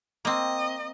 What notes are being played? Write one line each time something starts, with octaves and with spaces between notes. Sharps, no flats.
A#3 C4 D#5